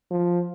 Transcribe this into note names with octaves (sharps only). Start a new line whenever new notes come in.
F3